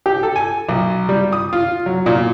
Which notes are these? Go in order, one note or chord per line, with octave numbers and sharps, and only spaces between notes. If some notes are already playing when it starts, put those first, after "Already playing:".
G4
A4
G#5
B1
G3
D#6
F4
F#3
A#2